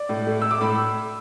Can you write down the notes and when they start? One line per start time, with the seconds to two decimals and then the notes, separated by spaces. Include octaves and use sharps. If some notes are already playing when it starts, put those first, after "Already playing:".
Already playing: D5
0.09 A2
0.27 A3
0.42 A3 E6
0.51 D6
0.61 A2 B5